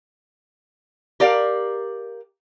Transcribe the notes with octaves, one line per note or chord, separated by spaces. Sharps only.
G4 A#4 D5 F5